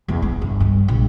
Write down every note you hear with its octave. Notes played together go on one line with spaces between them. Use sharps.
E2
B3
G1
G2
A#1